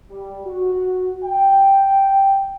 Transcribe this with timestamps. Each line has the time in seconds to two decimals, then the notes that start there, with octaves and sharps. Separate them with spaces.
0.11 G3
0.45 F#4
1.24 G5